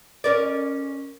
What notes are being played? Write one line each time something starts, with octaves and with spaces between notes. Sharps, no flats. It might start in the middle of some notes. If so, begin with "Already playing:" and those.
C#4 A#4 D5